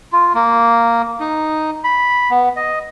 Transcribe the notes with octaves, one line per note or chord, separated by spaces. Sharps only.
F4
A#3
D#4
B5
B3
D#5